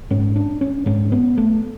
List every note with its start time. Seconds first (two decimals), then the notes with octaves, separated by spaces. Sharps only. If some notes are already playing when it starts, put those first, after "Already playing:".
0.10 G#2 C#4
0.36 D4
0.61 C#4
0.86 G#2 C#4
1.12 B3
1.38 A3